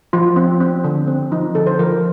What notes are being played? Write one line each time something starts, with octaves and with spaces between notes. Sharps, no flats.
F3 F4
C4
C4
D3
C4
F3 D#4
D3 A4
C5
F3 A#4